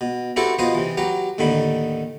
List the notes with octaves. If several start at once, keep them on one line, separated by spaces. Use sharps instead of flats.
B2
C4 E4 F#4 G4 A4 B4
B2 F3 B4 C5 D#5 D#6
C3 E3
F#3 G4 B4 A#5
D#2 A2 D3 D#3 B5